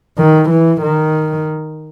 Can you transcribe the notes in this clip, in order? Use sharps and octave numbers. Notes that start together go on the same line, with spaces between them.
D#3
E3
D#3